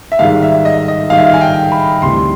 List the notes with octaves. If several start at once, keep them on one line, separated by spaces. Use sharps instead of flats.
E5
G#2 D#3 G3 F5
E5
D#5
D#5
G#2 D#3 G3 F5
E5
F5
G#5
G5
B5
D2 C3 E3 G3 C6